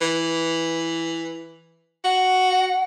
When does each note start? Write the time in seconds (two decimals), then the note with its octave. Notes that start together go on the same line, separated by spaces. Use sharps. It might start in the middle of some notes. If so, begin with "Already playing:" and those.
0.01 E3
2.04 F#4 F#5